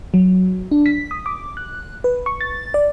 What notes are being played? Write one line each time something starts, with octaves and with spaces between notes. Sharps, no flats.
F#3
D4
B6
D#6
D6
F#6
B4
C#6
A6
D5